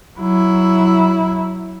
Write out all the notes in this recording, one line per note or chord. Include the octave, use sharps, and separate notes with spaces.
F#3 E4